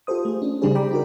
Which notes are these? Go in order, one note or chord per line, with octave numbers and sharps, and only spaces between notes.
F4 G4 A4 C5 D#6
A3 G#4
C#4 D4
C#3 G3 D4 G4 G#4 C5
D5 G5 A#5 B5 D6
D#4 F#4 A#4